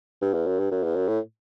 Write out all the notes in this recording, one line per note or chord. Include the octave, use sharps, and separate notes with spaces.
G2
E2
F#2
G2
F#2
E2
F#2
A2